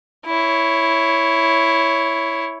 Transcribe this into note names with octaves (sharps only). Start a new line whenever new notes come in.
E4 C#5